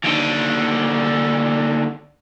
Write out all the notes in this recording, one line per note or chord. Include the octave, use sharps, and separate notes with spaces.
D#2 D3